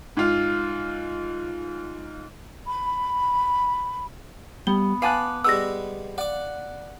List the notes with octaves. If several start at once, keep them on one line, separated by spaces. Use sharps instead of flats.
G#2 F4
B5
G3 B3 G7
B3 F5 G#5 A5 D6 F#6
G3 G#3 B3 E6 A#6
D5 F#5 D6